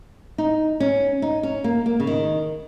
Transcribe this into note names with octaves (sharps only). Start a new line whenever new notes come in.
D#4
C#4
D#4
C#4
A#3
A#3
C#3
D#3